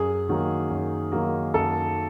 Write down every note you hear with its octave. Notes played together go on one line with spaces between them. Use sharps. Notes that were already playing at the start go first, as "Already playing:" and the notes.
Already playing: F#2 G#4
D#3 F#3 A#3
F#2
D#3 F#3 A#3
F#2 A4